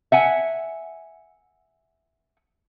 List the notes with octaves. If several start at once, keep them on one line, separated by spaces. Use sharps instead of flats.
E5 F#5 G#5